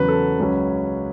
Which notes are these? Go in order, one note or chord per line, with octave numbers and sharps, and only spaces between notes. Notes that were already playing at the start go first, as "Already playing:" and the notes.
Already playing: E2 C#3 F#3 B4
A4
C#2 C#3 F#3 C#4 B4